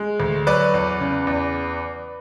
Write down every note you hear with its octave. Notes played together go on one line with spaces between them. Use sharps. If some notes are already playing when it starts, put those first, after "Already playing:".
Already playing: G#3
D2
F#3 B4 D5
E2
C#3
E2